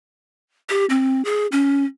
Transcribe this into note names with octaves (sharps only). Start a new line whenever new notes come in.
G4
C4
G#4
C#4